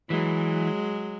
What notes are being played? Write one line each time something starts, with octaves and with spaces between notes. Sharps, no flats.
E3 F#3 G#3